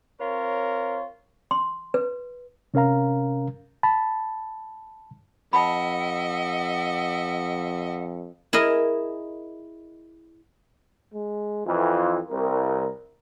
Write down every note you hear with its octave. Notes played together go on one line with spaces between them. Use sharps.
C4 F4 A#4 C#5
C6
B4
C3 C#4 A#4 F5 A#5
A5 B5
F2 D#5 E5 F#5 A5 B5
E4 G#4 A#4 D#5
G#3
F2 E3 F4
C2 A#4